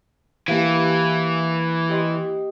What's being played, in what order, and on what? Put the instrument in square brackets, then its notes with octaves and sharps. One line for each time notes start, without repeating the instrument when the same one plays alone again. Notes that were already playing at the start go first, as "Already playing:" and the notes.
[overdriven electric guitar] E3 [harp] A#3 G4 F5
[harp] G4 D#5 C6